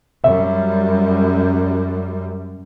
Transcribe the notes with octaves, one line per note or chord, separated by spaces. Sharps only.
F#2 G3 E5